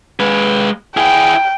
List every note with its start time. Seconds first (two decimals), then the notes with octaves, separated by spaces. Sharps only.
0.20 G#3 B4
0.97 E4 G#4 G5